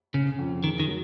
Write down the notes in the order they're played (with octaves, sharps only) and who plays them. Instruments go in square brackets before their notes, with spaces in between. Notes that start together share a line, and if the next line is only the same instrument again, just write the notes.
[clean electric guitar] C#3 [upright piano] C#4
[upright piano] F2
[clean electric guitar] D#3 [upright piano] G#4
[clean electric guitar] D#3
[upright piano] F#3